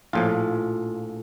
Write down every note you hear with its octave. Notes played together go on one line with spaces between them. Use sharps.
A#1 A2 F3 F4